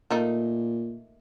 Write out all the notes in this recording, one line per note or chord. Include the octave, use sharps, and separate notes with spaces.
A#2 A3 A#3 D#4